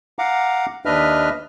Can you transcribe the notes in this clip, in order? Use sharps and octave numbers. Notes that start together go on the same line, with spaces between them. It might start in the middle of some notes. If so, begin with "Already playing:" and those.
F5 F#5 A#5 D6
D#2 D4 B4 D#5 E5 F6